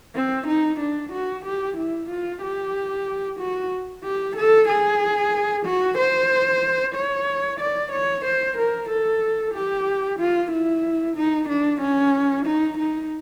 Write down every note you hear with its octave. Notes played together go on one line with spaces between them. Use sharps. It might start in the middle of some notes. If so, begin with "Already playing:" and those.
C4
D#4
D4
F#4
G4
E4
F4
G4
F#4
G4
A4
G#4
F#4
C5
C#5
D5
C#5
C5
A#4
A4
G4
F4
E4
D#4
D4
C#4
D#4
D#4